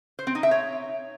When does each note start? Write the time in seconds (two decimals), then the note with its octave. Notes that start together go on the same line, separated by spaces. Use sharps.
0.19 C5
0.27 C4
0.35 D#4
0.43 E5
0.51 C#5